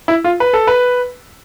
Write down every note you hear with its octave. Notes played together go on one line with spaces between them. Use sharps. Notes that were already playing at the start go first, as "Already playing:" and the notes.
E4
F4
B4
A4
B4